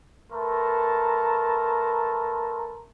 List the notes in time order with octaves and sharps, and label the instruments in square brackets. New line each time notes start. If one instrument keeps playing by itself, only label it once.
[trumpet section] A3 A#4 B4 A5 A#5 C6